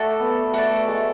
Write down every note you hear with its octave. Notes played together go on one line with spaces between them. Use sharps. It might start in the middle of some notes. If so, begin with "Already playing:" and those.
Already playing: A3 F#4 A4 D5
B3
A3 F#4 A4 D5
A3
G#3